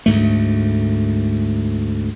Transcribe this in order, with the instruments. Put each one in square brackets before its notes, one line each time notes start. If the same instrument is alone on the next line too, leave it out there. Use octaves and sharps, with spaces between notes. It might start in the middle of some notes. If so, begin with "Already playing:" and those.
[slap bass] D2 G#2 A3